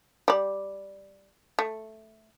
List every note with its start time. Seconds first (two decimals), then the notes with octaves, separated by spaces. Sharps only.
0.28 G3 D5
1.59 A3